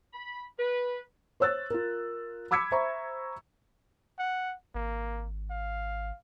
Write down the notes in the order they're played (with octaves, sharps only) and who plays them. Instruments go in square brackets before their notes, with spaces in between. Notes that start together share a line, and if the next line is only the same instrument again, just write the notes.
[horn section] B5
B4
[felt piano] C5 C#5 E6 F#6 A6
F4 A#4
B5 D6 E6 G#6 B6 C#7
C5 E5 A#5 B5 C#6
[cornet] F#5
[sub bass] G#1 [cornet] A#3
[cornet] F5